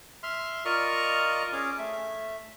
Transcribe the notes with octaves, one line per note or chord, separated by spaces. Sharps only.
E5 C6 F6
F4 A#4 D5 D#5 A#5 C#6
C#4 G#4 D6
A3 E5